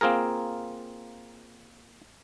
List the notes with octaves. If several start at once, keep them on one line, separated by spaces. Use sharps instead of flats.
A#3 C4 F4 G#4 A#4